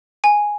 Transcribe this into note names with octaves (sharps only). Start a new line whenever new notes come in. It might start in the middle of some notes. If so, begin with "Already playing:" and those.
G#5